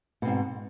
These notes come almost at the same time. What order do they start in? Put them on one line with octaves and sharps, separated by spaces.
B2 C4 G#2